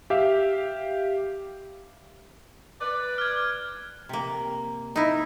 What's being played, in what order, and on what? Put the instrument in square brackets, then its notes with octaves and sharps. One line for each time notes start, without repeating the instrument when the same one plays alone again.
[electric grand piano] G4 E5 F5
[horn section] B4 D5
[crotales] F6 G#6
[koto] C3 A#3
D#4 E4